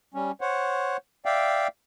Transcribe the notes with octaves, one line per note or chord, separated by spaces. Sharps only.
G3 C#4
C5 C#5 F#5
D5 E5 F5 G5